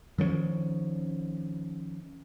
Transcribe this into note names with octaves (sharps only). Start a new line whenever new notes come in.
D#3 F3 A3 C#4